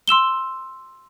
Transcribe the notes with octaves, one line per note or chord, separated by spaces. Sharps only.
C6 E6 E7 G7